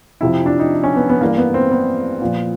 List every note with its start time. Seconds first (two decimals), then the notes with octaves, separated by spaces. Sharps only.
0.21 F2 C3 F3 E4
0.46 D4
0.59 D#4
0.84 C#4
0.96 B3
1.09 B3
1.21 G2 E3 A#3
1.38 B3
1.54 C4
1.71 B3
2.22 A#2 F3